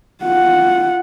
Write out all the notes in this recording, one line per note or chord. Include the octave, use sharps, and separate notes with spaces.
F4 F#5